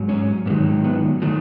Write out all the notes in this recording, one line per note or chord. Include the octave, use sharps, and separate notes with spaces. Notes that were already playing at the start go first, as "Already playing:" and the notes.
Already playing: G#2 F#3
C#4
G#2 D#3 F#3 B3
B3
D#3 F#3 A3